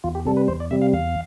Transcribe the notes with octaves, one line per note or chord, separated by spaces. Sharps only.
E2 F4
G4
C3 G3 A4
B4
E2 C5
D5
C3 G3 E5
F5
E2 F5